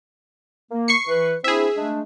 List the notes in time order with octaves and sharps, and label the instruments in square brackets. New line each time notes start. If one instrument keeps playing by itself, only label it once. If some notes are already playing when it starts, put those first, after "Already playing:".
[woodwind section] A#3
[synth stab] C#6 C7 C#7
[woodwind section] E3 B4
[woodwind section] C4 D4 E4 [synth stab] G#4 E5
[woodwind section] G#3 A3 D4